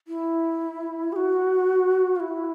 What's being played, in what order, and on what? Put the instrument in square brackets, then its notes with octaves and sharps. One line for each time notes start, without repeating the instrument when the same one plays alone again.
[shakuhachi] E4
G#4
F#4
F4
E4